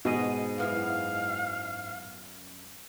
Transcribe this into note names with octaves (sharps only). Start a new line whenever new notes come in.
G#2 B2 G#4 D#5
F#2 B3 E4 F5